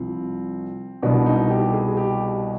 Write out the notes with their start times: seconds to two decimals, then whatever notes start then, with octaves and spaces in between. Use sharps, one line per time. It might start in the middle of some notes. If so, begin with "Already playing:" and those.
Already playing: C2 C3 F3 C4
1.02 C2 B2 D4
1.26 D#4
1.50 G4
1.73 G#4
1.97 G4